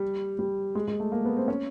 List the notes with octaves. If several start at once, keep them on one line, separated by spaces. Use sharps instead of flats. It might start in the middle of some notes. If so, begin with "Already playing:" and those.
Already playing: G3
G3
G#3
G#3
A3
A#3
B3
C4
C#4